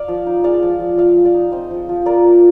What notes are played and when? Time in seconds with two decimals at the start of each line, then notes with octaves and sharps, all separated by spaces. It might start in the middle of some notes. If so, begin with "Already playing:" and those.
Already playing: D5 F5
0.08 F3
0.26 D#4
0.43 G#3 D5 F5
0.63 F3
0.80 F3
0.98 F3 D5 F5
1.16 F3
1.25 D5 F5
1.34 D#4
1.52 C4 C5 D#5
1.71 F3
1.89 F3
2.06 F4 A#4 D5
2.24 A#3